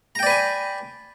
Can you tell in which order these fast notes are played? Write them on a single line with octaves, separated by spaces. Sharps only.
A#5 G5 D5 B4 G#5